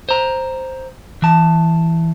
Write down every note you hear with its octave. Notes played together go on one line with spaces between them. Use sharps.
C5 A#5
E3 A5